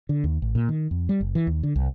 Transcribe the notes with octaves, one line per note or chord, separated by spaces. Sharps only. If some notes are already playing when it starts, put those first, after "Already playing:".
D3
D#2
A1
A#2
D#3
F2
G3
F#1
E3
D#2
D3
C2